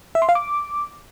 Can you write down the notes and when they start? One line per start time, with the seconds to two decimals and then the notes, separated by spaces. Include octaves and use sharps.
0.15 E5
0.22 C6
0.29 F5
0.35 D6